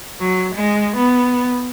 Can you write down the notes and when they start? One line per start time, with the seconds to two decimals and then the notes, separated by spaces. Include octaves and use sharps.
0.20 F#3
0.55 G#3
0.97 B3